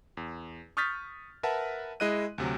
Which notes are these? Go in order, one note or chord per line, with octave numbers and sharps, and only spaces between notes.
E2
C#6 D#6 F6 G6 A6 B6
A#4 B4 E5 F#5 A5
G#3 E4 D#5 F#6 D#7
D2 C3 F#3